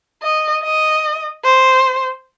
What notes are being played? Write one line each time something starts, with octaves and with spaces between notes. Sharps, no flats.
D#5
D#5
C5